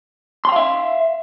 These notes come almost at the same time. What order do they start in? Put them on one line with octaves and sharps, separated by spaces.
C6 G5 F5 E5